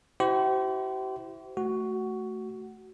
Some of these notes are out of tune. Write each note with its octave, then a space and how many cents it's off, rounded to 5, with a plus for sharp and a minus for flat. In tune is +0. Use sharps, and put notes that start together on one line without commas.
E4 +0 G4 -45 C5 -25
A3 +0 F#4 +10